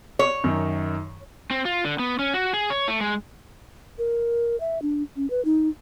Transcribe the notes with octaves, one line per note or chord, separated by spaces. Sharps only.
C#5
F#2 D#3 D#4
C4
F4
D3
B3
C#4
F#4
G#4
C#5
A3
G#3
A#4
E5
D4
C#4
B4
D#4